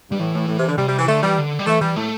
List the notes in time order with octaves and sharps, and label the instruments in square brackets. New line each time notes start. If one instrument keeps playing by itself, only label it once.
[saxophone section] G2 [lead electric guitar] G3
[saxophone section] A2 [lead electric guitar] E3
[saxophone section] A2
A2
C3
D3
[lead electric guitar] C3 [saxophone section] G3
[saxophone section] G3
E3
[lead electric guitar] D3 [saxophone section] A3
[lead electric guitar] E3 [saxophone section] G3
[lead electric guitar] D3
G3
[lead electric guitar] E3 [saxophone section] A3
[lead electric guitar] E3 [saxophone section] G3
[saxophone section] A2 [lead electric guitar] A3